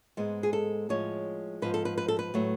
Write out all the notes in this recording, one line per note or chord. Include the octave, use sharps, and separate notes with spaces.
G#2 G#3 B3
G#4
A4
A2 F3 G#3 C#5
G#2 F3 B3 B4
A4
B4
B4
A4
B4
A2 F#3 A3